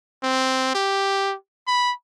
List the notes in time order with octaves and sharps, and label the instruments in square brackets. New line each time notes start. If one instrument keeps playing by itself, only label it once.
[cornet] C4
G4
B5